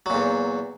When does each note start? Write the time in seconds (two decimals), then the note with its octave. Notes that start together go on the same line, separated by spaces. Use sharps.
0.06 F#3
0.10 A#2
0.14 E2